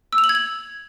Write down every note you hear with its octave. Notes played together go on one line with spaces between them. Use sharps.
E6
F7
F#7
G#6
F#7